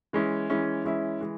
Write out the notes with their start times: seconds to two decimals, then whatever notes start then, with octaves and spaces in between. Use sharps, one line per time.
0.13 E3 G#3 C#4 E4
0.50 E3 G#3 C#4 E4
0.85 E3 G#3 C#4 E4
1.21 E3 G#3